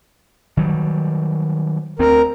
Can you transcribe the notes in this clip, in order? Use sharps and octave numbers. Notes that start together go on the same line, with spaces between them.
D#3 F#3 G3
D2 C4 A#4